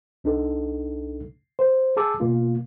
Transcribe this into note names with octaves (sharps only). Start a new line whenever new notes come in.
C2 D4 D#4 A4
C5
G#4 A5 D6 E6
B2 A#3 F4